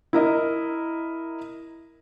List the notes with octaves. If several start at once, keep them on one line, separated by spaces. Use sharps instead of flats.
E4 A#4 D#5